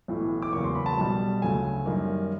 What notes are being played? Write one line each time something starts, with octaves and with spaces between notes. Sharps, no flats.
B1 A2 E3
D6
E1 E2 C#3 F#3 A#3 C#6
C6
B5
A5
B1 B2 G3
D2 C#3 F#3 A3 G#5
F#2 D#3 G3 A#3